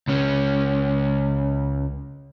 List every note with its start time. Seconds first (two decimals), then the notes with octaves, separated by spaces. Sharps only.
0.07 C#2 C#4